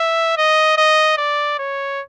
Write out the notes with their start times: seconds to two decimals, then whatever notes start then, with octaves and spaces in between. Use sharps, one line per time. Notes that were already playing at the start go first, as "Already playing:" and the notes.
Already playing: E5
0.37 D#5
0.78 D#5
1.18 D5
1.59 C#5